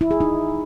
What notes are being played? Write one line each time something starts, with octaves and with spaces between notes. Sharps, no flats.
E4
G#4
D#4